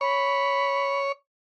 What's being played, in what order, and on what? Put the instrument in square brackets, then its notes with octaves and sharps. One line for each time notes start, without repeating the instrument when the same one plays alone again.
[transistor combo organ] C#5 [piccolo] B5